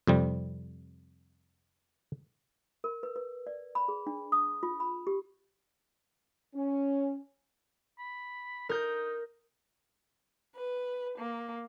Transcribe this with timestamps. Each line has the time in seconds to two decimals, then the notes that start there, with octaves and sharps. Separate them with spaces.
0.07 F2 C3 G3
2.84 A#4
3.03 B4
3.16 B4
3.47 D5
3.75 B5
3.88 G#4
4.07 D4
4.32 D#6
4.63 F4
4.80 B5
5.07 G4
6.55 C#4
7.99 B5
8.69 D#4 A#4 G6
10.55 B4
11.19 A#3